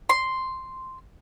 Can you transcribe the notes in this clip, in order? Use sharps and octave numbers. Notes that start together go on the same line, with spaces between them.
C6